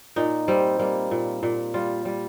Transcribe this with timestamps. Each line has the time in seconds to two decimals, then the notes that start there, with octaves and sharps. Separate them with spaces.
0.16 A#2 D#4
0.48 G3 C4
0.79 G3 A#3
1.11 A#2
1.43 A#2
1.74 G3 F4
2.05 G3